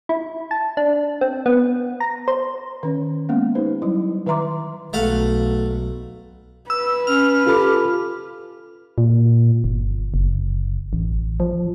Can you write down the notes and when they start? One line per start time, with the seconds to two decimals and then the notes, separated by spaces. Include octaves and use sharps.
0.09 E4
0.51 A5
0.77 D4
1.21 C4
1.46 B3
2.00 A#5
2.28 C5
2.83 D#3 C#4 C#5
3.29 G#3 A#3 B3 C#4
3.55 D#4 G4 B4 C5
3.82 F#3 G3 E4
4.26 D#3 B4 E5 A#5 C6 D6
4.93 B1 A3 F5 F#5
6.70 B4 E6
7.07 C#4 F6
7.46 F4 G4 A4 B5
8.98 A#2
9.64 G1
10.14 F#1
10.93 A1
11.40 F3